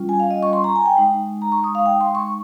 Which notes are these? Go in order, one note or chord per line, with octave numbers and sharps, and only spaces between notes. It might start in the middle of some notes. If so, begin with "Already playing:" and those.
Already playing: G3 C#4 F4
G#5
F5
D#5
C#6
C6
A#5
G#5
G5
G#3 D#4
A#5
C#6
D#6
F5
G5
C6
C#6